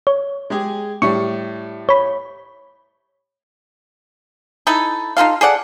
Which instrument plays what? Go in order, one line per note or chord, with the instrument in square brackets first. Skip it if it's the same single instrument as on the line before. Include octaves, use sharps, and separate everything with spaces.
[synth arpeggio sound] C#5
[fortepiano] G#3 G4 G#4
[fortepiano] A2 G3 [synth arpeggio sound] C#6
[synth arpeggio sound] C#5 B5
[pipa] D#4 E4 A4
D#4 F4 A4 F5
G#4 A4 D5 F#5